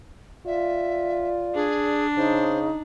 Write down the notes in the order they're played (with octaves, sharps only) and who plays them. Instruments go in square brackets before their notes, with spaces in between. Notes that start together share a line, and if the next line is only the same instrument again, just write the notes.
[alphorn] F4 [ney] D5 [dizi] E5
[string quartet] D4 [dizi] G#4
[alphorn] C#3 [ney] D#4 [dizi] C5